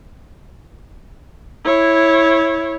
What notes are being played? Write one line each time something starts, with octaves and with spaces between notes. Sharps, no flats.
E4 C#5